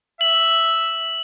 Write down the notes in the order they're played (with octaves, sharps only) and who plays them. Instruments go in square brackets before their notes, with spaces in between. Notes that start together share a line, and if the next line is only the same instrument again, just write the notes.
[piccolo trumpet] E5 [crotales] F#7